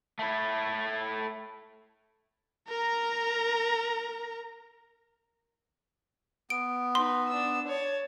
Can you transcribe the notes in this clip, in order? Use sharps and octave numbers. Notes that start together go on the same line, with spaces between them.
A3 E4
A#4 A#5
B3 D7
D#4 B4 C6
D4 E6
C#5 A5